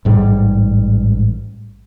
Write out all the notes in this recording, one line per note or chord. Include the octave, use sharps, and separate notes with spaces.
A1 G#2 G3